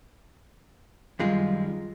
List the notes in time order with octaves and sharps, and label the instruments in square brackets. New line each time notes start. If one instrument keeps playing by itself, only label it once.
[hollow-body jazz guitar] F#2 G#3 F4 [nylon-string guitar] D#3 G3